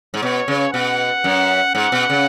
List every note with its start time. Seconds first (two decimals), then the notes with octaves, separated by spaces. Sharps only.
0.14 G#2
0.22 B2 C#5
0.48 C#3
0.73 B2 F#5
1.24 F#2
1.75 G#2 F#5
1.92 B2
2.10 C#3